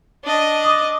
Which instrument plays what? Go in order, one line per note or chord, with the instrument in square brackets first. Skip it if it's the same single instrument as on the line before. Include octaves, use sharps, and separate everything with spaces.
[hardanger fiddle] D4 D#5
[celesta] D6 D#6